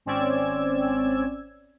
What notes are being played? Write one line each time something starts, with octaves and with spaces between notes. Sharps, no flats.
G#1 C4 C#4 D5 E6 G#6